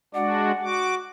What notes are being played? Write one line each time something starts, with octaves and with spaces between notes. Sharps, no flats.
G#3 D4 F#4 D5 F#5
F#4 D6